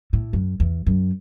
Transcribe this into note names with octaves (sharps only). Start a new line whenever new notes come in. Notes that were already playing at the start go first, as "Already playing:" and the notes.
A2
F#2
E2
F#2